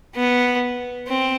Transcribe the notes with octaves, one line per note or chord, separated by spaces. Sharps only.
B3
C4